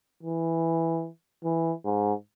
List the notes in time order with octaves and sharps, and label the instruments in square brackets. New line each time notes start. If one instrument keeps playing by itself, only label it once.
[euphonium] E3
E3
G#2